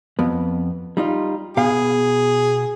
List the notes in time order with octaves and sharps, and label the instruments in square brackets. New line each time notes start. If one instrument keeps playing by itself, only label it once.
[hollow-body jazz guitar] F2 B3
G3 D#4 F4
[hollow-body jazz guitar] B2 F5 [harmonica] G#4